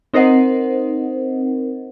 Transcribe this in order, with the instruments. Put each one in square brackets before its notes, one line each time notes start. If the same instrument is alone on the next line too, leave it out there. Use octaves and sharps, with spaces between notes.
[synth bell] C4 D#4 A#4 C5 D#5 F#5